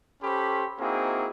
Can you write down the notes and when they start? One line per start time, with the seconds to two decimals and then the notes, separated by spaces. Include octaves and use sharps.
0.22 C#4 G4 A4 C5 B5 C#6
0.79 A#3 C4 D#4 E4 F#4 G#4